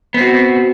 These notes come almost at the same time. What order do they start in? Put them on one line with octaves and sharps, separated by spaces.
B3 C4 F#4